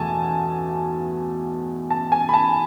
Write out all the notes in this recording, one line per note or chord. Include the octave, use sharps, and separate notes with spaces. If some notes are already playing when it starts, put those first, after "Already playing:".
Already playing: E2 B2 A3 G#5 A5
A5
G#5
B5
A5